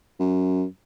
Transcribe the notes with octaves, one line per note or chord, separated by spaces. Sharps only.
F#2